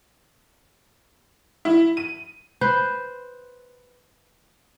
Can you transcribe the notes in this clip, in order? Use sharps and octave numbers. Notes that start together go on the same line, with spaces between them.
E4
D#7
B4 C5